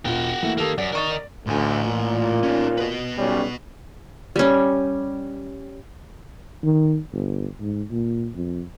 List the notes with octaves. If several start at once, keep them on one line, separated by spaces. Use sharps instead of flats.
E1 F4 F#4 G5
E3 A3 A#3
D#3 A#3 G4 A4
F#2 D5
A#4 D5 D#5 C#6 A6
D5
D2 A2 G#5
A#2
C#4 D#4
F#4 B4
B1 G3 C#4
G3 C#4
D#3
G1
G#2
A#2
F2